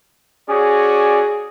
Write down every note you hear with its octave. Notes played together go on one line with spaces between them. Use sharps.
C#4 F#4 G#4 D5